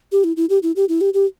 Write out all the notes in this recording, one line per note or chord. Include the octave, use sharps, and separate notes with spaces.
G4
E4
E4
G4
E4
G4
E4
G4
G4